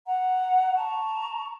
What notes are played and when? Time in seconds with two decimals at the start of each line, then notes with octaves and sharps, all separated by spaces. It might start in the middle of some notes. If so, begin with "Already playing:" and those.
0.06 F#5 A#5
0.75 A5 A#5 C#6